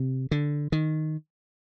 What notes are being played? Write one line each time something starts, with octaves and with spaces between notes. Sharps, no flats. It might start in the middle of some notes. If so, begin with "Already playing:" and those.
Already playing: C3
D3
D#3